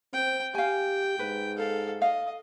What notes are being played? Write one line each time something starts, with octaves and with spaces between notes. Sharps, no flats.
C4 G5
G4 F5 G5 G#5
G#2 B4
A4 F5
D#5 F5